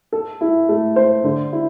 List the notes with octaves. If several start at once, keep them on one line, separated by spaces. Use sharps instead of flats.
A4
E4
A3
C5
D3
E4